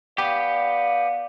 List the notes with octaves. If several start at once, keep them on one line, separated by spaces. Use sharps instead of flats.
B3 G4 D5 F5